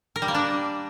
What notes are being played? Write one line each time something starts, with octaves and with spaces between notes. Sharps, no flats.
A#4
G3
A#3
D4